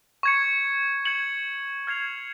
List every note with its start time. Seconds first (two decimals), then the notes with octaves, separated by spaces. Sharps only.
0.23 C#6 G#6 C#7
1.05 G#6 C#7 F#7
1.87 F6 G#6 C7 F7